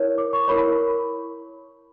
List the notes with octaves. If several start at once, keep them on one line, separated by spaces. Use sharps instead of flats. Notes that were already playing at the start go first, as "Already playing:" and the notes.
Already playing: E4 A#4 C#5
D6
C#6
E4 A#4 C#5 B5